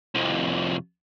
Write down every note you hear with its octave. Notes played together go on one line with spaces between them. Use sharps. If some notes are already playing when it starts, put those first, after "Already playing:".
C2 F2